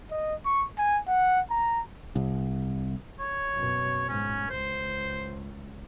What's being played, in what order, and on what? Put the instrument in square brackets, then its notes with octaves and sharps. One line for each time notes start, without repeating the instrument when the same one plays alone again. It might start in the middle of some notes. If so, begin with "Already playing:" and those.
[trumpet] D#5
C#6
G#5
F#5
A#5
[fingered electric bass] C2
[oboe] C#5
[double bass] F#2 B2
[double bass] G#2 [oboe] C#4
[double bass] C#2 [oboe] C5